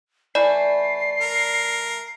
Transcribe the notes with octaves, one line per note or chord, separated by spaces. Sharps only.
E3 A3 D5 C7
A#4